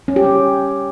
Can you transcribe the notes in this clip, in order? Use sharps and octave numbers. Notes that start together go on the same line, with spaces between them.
C#4
G4
C#4